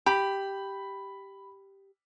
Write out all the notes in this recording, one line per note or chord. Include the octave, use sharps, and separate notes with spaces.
G4 B5